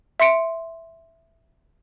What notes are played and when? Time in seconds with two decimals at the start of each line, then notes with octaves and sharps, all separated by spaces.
0.20 E5 C6 C#7 D7